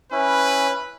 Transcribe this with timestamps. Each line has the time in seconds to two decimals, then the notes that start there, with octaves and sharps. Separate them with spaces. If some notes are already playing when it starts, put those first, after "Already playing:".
0.12 C#4 E4 B4